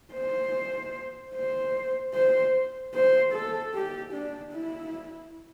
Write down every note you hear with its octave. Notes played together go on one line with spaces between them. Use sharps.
C5
C5
C5
C5
A4
G4
D4
E4